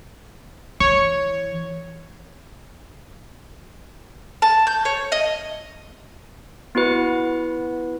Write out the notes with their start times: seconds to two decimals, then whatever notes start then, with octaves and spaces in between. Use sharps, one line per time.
0.80 E3 C#5
4.42 A5
4.67 G6
4.85 C#5
5.12 D#5
6.75 B3 E4 F#4 B4